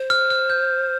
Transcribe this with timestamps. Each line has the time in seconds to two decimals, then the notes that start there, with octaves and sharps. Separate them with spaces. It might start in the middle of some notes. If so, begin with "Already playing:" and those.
Already playing: C5
0.10 F6
0.30 F6
0.50 G6